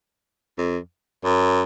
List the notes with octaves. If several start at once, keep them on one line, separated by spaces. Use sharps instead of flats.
F2
F#2